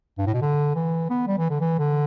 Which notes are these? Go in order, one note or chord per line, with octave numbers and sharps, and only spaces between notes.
G2
A2
B2
D3
E3
B3
G3
E3
D3
E3
D3